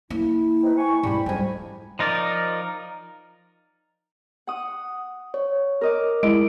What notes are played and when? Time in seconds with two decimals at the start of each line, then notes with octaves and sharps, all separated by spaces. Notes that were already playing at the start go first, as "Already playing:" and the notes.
0.10 A#3 E4
0.63 C4 D#4 B4
0.77 G#5 C#6
1.03 G#2 A3 D4 G4 B5
1.26 F2 G#2 G3 G#3 G#5
1.99 F3 D#4 A#4 D5
4.47 F#5 D#6
5.34 C#5
5.81 A#4 D#5 D6
6.23 G#3 E4 D7